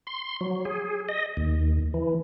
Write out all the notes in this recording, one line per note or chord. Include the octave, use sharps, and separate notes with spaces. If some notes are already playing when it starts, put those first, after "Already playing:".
C6
F#3
G#4
D#5
D#2
E3